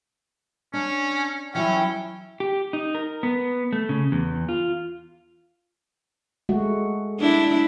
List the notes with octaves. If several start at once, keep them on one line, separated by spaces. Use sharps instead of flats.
C#4 D4
E3 F#3 C#4 E4 G5
G4
D#4
A#4
B3
A3
C#3
E2
F4
G#3 A3 F#4
D4 E4